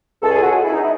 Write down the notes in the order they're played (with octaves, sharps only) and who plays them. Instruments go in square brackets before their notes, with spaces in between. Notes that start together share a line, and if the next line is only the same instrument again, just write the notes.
[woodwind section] C#2 A4
G#4
F#4
C#2 G#4
E4
D#4
E4